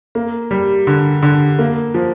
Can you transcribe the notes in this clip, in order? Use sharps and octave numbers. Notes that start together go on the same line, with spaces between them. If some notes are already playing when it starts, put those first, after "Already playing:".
A#3
G3
D3
D3
A#3
F3